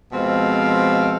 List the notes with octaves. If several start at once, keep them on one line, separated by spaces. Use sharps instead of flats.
B2 F3 G#3 C4 A4 F5